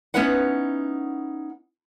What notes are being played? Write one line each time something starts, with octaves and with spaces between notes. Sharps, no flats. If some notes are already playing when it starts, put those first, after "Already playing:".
B3 C#4 D#4 E4 B4 F#5